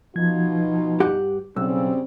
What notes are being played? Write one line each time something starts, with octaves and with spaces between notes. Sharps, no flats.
B2 F3 D#4 F4 G#6
G2 G4 F#5
B1 C#3 G3 C4 E6